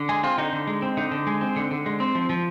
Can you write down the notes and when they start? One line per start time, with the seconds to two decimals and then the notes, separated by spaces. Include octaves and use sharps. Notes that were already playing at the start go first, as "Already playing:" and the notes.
Already playing: D3
0.09 G#3 G#4
0.23 C4 F4
0.38 D3 D#4
0.53 D3
0.67 G#3
0.82 C4
0.97 D3 D#4
1.11 D3
1.27 G#3
1.41 C4
1.56 D3
1.71 D3
1.86 G#3
2.00 C4
2.15 F3
2.29 F3